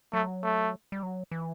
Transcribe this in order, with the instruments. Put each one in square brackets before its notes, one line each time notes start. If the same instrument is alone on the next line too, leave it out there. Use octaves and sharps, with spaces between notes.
[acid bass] F#3 [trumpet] A3
[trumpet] A3
[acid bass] G3
F#3
E3